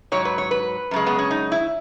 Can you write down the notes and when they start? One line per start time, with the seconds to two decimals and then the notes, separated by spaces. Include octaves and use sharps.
0.12 G#2 F#3 C#5
0.25 B4
0.38 C#5
0.51 B4
0.91 F#2 C#3 G#3
1.06 B3
1.18 C#4
1.31 D#4
1.52 E4